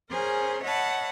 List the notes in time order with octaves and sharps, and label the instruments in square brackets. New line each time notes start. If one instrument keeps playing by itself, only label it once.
[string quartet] C#4 G#4 A#4 C5
C#5 D#5 E5 F#5 A5 B5